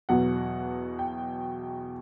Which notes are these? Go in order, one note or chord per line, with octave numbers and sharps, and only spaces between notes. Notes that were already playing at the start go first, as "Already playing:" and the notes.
E2 B2 F#3 F#5
G5